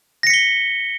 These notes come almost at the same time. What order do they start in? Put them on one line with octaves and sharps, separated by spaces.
A#6 C#7 B6 G7